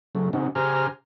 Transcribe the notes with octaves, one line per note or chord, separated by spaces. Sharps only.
C#3 F#3 A3
C#3 C4 C#4 D#4 F#4
C#3 G4 C5 G#5 A#5 F6